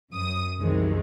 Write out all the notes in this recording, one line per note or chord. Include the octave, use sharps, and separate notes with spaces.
F#2 D#6
C2 F#2 C3 D#3 E3 G#3